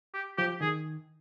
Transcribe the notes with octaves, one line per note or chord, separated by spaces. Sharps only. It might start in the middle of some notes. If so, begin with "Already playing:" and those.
G4
F3 G4
D#3 G#4